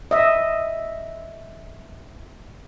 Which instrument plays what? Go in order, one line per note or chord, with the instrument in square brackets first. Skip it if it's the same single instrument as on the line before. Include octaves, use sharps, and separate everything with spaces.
[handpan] D#5 E5